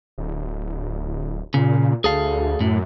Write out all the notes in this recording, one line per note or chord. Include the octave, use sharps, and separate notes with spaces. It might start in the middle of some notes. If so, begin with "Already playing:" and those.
D1
A#2 C#3
D2 G#4 A4 F5
F#2 A2